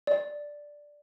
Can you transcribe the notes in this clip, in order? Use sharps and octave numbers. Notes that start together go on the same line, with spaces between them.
D5